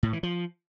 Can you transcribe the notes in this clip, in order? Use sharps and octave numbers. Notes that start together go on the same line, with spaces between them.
A2
E3
F3